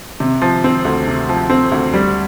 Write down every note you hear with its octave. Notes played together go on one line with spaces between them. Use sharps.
C3
F3
C4
D2
C3
F3
C4
D2
G3